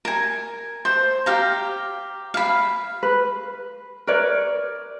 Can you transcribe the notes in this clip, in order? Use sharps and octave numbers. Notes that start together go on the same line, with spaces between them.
A#4 G#5
C5
G4 F5 A#5
F5 B5
B4
A#4 B4 C#5 D5